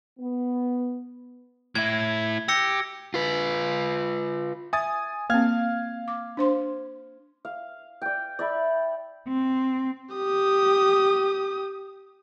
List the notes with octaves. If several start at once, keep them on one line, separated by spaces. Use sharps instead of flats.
B3
A2 E4 G#6
G4 E6 A#6 C#7
F4 B4
E5 G#5 D#6 A6
A#3 C4 F5 F6 G#6
D6
D4 C5 C6
F5
D5 G5
D5 E5 B5
C4
G4 D#6